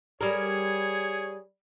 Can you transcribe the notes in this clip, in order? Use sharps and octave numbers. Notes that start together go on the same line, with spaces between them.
G3 G#4 A#4 C#5